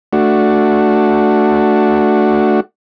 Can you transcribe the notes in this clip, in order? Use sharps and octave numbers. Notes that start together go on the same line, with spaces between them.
A3 D4 F#4